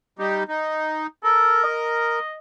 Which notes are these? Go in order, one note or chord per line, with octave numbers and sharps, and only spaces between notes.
G3 D#4 G4
D#4
A4 A#4
D#5